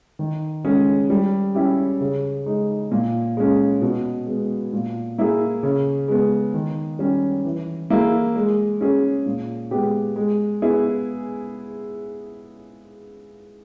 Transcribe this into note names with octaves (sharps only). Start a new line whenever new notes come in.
D#3
G#3 C#4 G#4
G3
C#4 E4 G4
C#3
G#3 D#4
A#2
G#3 C#4
B2
G#3 B3
A#2
A#3 E4 G#4
C#3
G#3 B3
D#3
G3 C#4 G4
E3
A#3 E4 G#4
G#3
C#4 G#4
A#2
G#3 B3 G4
G#3
B3 E4 G#4